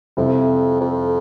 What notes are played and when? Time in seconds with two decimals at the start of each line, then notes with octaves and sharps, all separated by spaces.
0.17 F2 C3 G3 C4 E4
0.81 F2